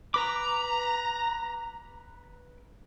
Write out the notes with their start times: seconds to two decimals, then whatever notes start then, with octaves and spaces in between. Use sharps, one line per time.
0.14 B4 A#5 B5 D6